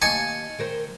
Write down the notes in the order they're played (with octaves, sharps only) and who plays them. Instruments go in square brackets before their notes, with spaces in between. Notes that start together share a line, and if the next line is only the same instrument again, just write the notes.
[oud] D#2 D#5 [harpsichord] G#5 A5 C#6
[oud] D#3 A#4 C5